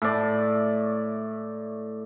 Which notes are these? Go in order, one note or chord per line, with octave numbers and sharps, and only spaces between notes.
A2 D5